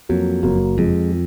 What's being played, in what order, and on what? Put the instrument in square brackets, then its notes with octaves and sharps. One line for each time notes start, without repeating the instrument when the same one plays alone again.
[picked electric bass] F2 [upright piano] F#3 A#3
[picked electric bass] F#1 [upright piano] F#3 A#3
[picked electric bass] F2 [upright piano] F3 G#3
[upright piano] F3